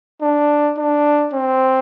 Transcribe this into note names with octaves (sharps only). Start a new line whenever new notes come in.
D4
D4
C4